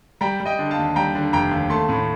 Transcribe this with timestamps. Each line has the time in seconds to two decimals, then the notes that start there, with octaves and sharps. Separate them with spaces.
0.21 G3 G5 A#5
0.40 G3
0.46 D#5 G5
0.59 D3
0.70 F5 A5
0.78 D#2
0.96 G3 G5 A#5
1.15 D3
1.33 F1 G5 A#5
1.51 D#2
1.70 A3 A5 C6
1.89 A2